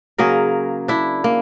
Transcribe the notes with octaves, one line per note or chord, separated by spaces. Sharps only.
C#3 F#3 A#3 G#4 A#4
D4 E4
A#3